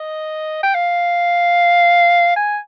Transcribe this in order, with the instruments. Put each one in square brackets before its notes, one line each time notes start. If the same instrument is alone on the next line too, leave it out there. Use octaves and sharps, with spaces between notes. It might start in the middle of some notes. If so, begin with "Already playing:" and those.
Already playing: [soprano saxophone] D#5
G5
F5
G#5